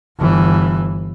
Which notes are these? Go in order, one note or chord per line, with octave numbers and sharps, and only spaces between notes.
G1 E3